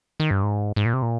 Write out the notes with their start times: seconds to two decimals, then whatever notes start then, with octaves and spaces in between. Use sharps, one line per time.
0.20 D#3
0.31 G2
0.43 G#2
0.76 G#2
0.86 A#2
0.94 C3
1.02 A#2